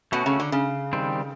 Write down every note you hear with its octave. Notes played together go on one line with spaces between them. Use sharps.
B2 A3 C#4 F#4
C#3
D3
C#3
D#3 G3 C4